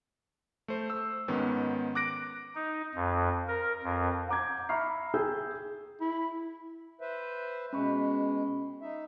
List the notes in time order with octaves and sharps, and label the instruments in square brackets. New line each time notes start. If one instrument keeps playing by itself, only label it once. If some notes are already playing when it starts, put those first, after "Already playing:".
[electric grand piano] A3 C5
E6
G#2 D#3 B3 C#4
D6 F#6 A#6 D7
[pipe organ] D#4
F2
A#4
F2
[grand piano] F#5 A#5 D6 G6 G#6
E5 A#5 B5 C#6 F6 C7
G#4 G5 E6 G6
[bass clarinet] E4
[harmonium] B4 C5 E5
[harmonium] B2 G#3 [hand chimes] C#4 B5 C#6
[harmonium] D#4 E5